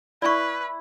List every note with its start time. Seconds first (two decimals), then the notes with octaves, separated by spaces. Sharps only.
0.22 E4 B4 D5 C#6